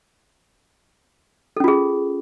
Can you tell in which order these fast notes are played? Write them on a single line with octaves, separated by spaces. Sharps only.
A4 C#4 F4 G#4